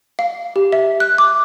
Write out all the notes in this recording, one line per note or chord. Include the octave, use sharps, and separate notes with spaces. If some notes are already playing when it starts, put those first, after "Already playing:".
F5
G4
E5
F#6
D6